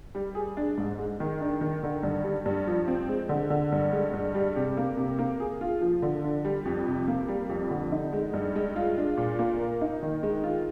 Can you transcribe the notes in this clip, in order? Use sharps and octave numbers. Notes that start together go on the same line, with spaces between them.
G3
G#4
D4
G#2
G#3
D#3
D4
D#3
D3
G2
G3
G2
F3
C4
G#3
D3
D3
G2
G#3
G2
G3
C3
A#3
C3
A#3
G#4
F4
F3
D3
D4
G3
F2
C3
A#3
G3
F2
D3
D#4
G#3
G2
G#3
F4
D4
A#2
A#3
A#4
D#4
D#3
G#3
F4